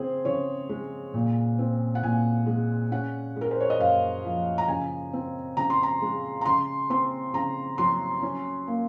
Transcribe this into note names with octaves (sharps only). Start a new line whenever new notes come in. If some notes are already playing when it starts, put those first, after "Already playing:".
Already playing: C#3 C4 G#4 C5
C#3 C#5
G#3
A#2
C4
F#5
A#2 G#5
G#3
C#4 F#5
G#3
A#4
C5
C#5
D#5
F#2 F5
F3
A#5
C#3 G#5
C4
C#3 A#5
C6
A#5
G#3
A#5
C#3 C6
C4 C6
C#3 A#5
F#3 C6
C#4
A#3